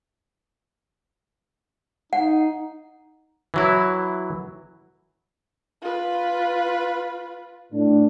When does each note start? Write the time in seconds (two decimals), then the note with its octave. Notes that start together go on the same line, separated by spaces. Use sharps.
2.13 D#4 F#5
3.54 E3 F#3 E4
5.82 F4 B4
7.73 A2 D4